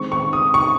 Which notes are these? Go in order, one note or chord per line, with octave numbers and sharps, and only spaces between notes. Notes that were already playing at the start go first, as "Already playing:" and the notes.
Already playing: D#3 G#3 C4 C#6
C#6
D#6
C#6